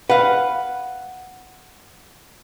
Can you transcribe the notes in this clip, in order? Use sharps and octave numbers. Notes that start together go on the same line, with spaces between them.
B4 F5 F#5